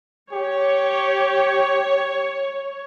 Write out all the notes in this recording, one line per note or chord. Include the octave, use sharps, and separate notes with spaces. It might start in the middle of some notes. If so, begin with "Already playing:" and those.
G4 C#5